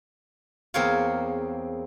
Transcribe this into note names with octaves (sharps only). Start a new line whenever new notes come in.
E2 A#3 C4 G#4 C#5 F5